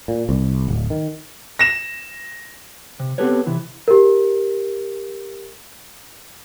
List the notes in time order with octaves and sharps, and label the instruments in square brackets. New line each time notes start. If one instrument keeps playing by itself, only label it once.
[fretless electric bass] A#2
C2
D1
D#3
[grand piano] A#6 E7
[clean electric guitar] C3
B3 C4 G4 A4 B4 C#5
C3 E3 E4
[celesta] G4 A#4